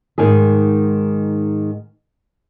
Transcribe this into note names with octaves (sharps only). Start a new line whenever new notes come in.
G#2 D#3 G#3 G#4